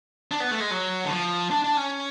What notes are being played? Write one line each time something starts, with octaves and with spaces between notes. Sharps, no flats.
D4
B3
A3
G#3
F#3
D3
F3
D4
D4
C#4